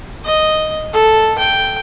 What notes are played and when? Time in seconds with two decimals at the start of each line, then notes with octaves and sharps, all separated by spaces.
0.24 D#5
0.93 A4
1.39 G5